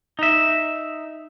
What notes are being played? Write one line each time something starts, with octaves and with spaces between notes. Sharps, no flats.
D#4 E5